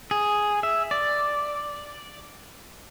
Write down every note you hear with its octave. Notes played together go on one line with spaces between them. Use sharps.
G#4
E5
D5